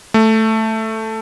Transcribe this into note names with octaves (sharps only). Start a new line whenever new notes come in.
A3